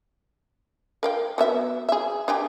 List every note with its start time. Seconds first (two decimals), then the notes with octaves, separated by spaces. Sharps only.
1.03 A#4 F5 G5
1.38 F#3 B3 E5
1.89 G#4 E5
2.28 D4 G4 G#4